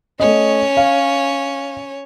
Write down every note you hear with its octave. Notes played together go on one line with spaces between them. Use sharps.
A3 C#4 C#5 D#5
F5